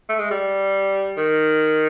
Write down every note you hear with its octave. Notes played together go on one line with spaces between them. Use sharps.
A3
G#3
G3
D#3